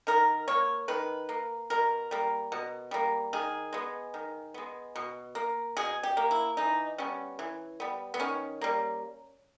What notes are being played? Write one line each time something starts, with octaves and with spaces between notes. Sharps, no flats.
D#3 A#4
A#3 C#5
D#3 B4
A#3
B2 A#4
G3 A#3
B2
G3 A#3
D#3 G#4
G#3 B3
D#3
G#3 B3
B2
A#3
B2 G#4
G4
A#3
E4
E3 D#4
G3 B3 C#4
E3
G3 B3
B3
D#3 C#4
G3 A#3